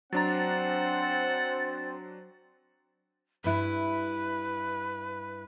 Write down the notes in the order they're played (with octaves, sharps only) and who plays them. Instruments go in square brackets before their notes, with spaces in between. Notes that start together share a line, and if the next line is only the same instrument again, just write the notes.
[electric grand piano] F#3 D4 A#5 [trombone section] C4 C5 [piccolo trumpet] F#5 [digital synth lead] A6
[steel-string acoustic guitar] G2 E4 [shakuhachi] B4